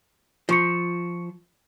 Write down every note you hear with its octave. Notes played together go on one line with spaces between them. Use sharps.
F3 F4 C#6 C#7